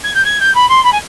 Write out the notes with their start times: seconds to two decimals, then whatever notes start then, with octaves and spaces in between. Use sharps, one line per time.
0.03 G#6
0.14 G6
0.25 G#6
0.40 G6
0.55 B5
0.69 C6
0.84 B5
0.92 G#5